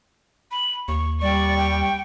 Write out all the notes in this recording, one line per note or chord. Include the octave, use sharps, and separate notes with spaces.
B5
D#2 C#6
G3 D5 C#6
G5